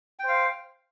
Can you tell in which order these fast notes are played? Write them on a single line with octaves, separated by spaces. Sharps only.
G5 C5 F5